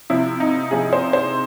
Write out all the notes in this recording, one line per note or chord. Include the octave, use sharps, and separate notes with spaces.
C3 F3 E4
D#4
C3 F3 G#4
C5
C5